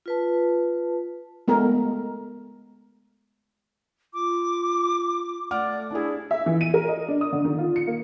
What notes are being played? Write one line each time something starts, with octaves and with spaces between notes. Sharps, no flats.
F4 B4 A5
G#3 A3 B3 A#4
F4 D6
A3 D5 F#5 D6 F6
D4 E4 G#4
E5
E3
D#7
A#4
D#5
D4
D#6
D3
D#3
F4
C#7
A#3